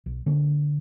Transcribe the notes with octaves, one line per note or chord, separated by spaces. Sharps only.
B1
D3 A#3